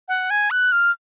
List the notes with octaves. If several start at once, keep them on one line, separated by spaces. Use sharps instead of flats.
F#5
G#5
F#6
F6